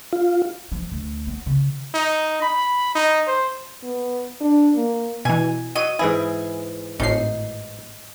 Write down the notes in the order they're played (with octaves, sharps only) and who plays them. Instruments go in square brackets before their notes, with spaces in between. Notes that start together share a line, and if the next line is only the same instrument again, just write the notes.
[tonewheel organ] F4
[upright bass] F3
D2
B3
C#3
[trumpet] D#4
B5
D#4
C5
[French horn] B3
D4
A#3
[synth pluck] B2 E3 [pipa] G#5
[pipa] F#3 D#5 [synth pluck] D#7
[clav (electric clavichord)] G#2 E3 E4 [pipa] G#4
[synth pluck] G#1 A2 C7 [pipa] D#4